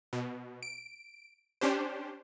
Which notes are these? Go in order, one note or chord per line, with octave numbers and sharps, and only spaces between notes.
B2
D7
C#4 D4 G4 C5